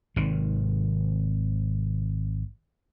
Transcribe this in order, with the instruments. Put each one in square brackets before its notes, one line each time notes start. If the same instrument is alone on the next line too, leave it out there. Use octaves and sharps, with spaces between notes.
[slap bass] G#1 C3 D#3